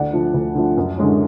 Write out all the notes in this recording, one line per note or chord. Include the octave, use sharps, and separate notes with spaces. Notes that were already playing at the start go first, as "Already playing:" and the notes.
Already playing: D2 D5 F#5
D3 F3 A3
D2
D3 F3 A3
F#2
D3 G#3 C#4